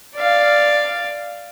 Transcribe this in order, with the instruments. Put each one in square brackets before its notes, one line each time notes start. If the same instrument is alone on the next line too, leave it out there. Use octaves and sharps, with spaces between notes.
[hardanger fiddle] D5 F5